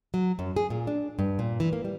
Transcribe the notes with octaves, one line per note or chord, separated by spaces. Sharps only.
F#3
F#2
G#4
A#2
D4
G2
A#2
E3
A#3
G3